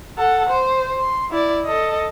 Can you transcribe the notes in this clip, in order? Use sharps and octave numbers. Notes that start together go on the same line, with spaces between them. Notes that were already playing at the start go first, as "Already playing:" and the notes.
A4 F#5
C5
C6
E4 D5
A4 D#5